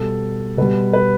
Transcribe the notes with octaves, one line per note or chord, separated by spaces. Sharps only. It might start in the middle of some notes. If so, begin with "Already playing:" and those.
Already playing: B2 G3 A4
B2 G3 B4
B4